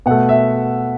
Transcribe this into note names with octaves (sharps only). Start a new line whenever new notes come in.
B2 A3 F#5
E5